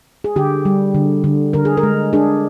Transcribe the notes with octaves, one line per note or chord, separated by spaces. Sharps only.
G#4
D3 G4
G3
D3
D3
D3 A#4
G#4
A#4
G#3
D4 G#4